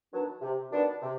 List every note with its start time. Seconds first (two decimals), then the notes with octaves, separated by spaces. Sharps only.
0.10 D#3 F#3 B3 D4
0.41 C3
0.71 D#3 F#3 B3 D4
1.02 C3